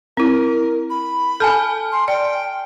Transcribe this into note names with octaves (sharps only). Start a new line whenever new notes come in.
C4 E4 A#4
B5
A4 G#5 A5 F6
C6
D5 G5